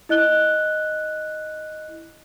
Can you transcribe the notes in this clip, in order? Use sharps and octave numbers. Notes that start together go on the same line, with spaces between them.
E4 D#5 F#6 G7